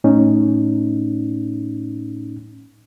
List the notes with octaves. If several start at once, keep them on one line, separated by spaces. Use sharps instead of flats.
A2 C#4 D#4